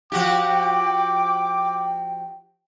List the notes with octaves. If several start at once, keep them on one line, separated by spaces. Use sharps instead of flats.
F3 F#4 G4 G5 D6